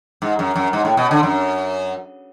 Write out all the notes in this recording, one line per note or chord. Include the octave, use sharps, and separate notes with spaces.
G#2
F#2
F#2
G#2
A2
B2
D3
F#2